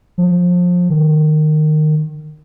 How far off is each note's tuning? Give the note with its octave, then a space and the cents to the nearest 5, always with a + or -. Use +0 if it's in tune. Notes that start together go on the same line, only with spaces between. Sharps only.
F3 +25
D#3 -20